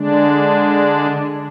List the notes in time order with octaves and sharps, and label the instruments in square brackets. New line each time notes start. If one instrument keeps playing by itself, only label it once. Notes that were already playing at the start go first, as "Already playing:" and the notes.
Already playing: [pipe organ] D3 G#3 D4